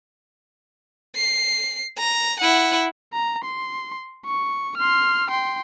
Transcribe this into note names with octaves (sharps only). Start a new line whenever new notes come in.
C7
A#5
E4 F#5
A#5
C6
C#6
C6 F6
G5 C6